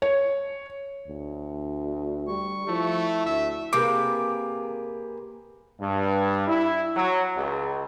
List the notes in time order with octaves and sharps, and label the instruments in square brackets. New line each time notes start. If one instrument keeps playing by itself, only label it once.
[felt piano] C#5
[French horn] D2
[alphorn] G3 [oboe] C#6
[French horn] F3 [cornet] A3 [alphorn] E4
[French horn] D2 [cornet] E5
[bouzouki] C3 [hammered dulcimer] A#3 G#4 B4 [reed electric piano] D6
[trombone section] G2
E4
F#3
C#2